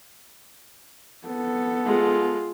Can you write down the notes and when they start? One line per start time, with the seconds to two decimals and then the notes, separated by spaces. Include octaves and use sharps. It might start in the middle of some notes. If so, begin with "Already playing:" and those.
1.27 B3 A4
1.85 G#3 F4